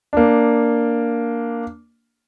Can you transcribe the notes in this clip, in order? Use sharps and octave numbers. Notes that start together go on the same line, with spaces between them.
A#3 D4